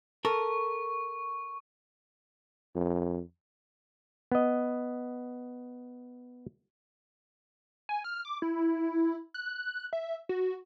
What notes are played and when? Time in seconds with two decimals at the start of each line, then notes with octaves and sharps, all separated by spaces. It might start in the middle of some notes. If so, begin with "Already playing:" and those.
0.25 A4 A#4 C#6
2.75 F2
4.32 B3 D#5
7.89 G#5
8.04 F6
8.25 D6
8.42 E4
9.34 F#6
9.93 E5
10.29 F#4